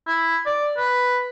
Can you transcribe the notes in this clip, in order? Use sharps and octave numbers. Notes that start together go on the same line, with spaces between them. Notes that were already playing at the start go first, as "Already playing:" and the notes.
E4
D5
B4